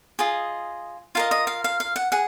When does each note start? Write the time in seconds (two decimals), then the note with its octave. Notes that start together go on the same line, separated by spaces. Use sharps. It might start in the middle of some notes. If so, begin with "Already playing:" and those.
0.19 F4 G#4 D#5
1.15 F4 A#4 D#5 F5
1.31 D#5
1.47 F5
1.64 F5
1.80 F5
1.96 F#5
2.12 G#4 F#5